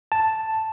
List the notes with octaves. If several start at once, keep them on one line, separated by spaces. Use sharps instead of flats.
A5